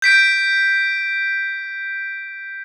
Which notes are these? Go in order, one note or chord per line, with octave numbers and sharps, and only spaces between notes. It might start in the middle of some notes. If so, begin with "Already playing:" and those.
G6 B6 D7